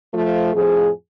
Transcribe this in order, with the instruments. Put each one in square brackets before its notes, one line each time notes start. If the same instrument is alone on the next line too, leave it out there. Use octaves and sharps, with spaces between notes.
[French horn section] F3 A3 F4
[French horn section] F2 A2 F3 [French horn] G#4